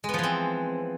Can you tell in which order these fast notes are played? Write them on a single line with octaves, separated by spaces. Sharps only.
G#3 B3 F3 E3 C4